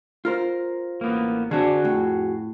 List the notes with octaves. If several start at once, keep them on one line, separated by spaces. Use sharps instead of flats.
F4 A#4 C5
A1 A#3 B3
D3 C4 D4 F#4 G#4
F2 A2